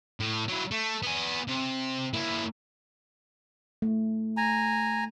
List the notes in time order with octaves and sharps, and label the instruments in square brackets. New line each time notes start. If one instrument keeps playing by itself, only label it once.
[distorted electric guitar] A2
F#3 E4
A3
B3 G#5
C3
A#3 E4
[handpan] A3
[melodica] G#5 A#5